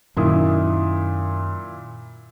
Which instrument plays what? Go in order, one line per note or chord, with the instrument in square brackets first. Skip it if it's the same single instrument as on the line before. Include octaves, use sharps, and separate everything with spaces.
[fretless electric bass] F#2 D#3 [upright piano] A#2 E4 D#6